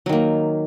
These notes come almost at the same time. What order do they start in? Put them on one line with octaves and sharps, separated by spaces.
F#3 D#3 A#3